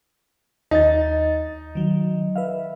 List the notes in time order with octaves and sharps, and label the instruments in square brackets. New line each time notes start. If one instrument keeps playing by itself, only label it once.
[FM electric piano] D#2 A6 [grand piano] D#4
[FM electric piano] D#3 F#3
B4 E5 F5